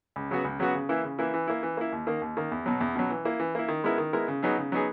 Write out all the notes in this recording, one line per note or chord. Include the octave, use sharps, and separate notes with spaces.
C#2
C#3 F#3 B3 F#4
C#2
C#3 F#3 B3 F#4
C#3
E3 A#3 E4
C#3
E3 A#3 E4
E3
A#3 E4
E3
A#3 E4
D#2
D#3 A#3
D#2
D#3 A#3
E2
B2 F#3
E2
B2 F#3
E3
A#3 E4
E3
A#3 E4
D#3
G#3 B3 E4 A#4
D#3
G#3 B3 E4 A#4
C#3
F#3 B3 D#4 G#4
C#3
F#3 B3 D#4 G#4